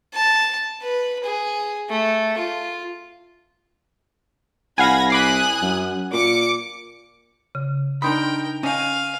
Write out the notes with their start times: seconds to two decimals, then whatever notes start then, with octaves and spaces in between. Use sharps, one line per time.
0.14 A5
0.82 B4
1.24 G#4
1.90 A3
2.38 F4
4.78 C2 F5 F#5 G#5 B5 G#6 A#6
5.10 G#5 B5 D6 D#6 F#6 C7
5.62 F#2
6.13 A#2 D6 C#7
7.55 C#3
8.02 D4 D#4 A#4 G5 B5 C6 D#6
8.63 C#4 D#5 F5 G#5